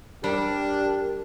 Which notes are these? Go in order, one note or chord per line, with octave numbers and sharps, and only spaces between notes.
G3 D4 G4 A#4